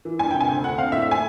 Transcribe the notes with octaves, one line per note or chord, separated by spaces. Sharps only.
E3
G2 G#5
C3 G5
G#5
D2
D3 F#5
C4 F5
A2 E5
E5
A3 G#5